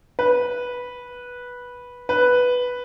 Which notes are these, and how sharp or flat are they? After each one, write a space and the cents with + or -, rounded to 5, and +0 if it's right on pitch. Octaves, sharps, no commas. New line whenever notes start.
B4 -10
B4 +0